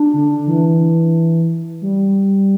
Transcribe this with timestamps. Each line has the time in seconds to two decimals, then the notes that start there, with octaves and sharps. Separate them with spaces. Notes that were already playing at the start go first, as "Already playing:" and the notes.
Already playing: D4
0.14 D3
0.47 E3
1.82 G3